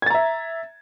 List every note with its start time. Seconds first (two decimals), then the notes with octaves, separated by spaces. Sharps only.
0.02 G#6
0.06 A6
0.10 A#5
0.14 E5